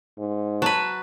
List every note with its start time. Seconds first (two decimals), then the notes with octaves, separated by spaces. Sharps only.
0.18 G#2
0.62 F#3 B4 A5